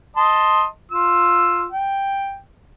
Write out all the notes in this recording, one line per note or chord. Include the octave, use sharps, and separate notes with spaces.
D#5 A5 C6
F4 E6
G5